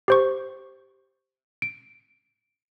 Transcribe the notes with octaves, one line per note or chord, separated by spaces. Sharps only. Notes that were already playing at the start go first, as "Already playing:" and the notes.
G4 C5 C#6
D7